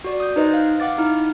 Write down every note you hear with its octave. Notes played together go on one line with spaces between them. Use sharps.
F#4 D5
D#6 G6
D#4 B4 C5 D#5
F5
F5 F#5 D6 A6
D#4 E4 F6